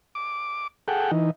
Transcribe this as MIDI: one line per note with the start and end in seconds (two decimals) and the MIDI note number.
0.15 0.67 86
0.88 1.11 68
0.88 1.11 69
0.88 1.11 78
0.88 1.11 79
1.11 1.31 52
1.11 1.31 63